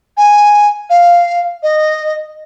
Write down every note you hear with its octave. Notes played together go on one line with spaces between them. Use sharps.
G#5
F5
D#5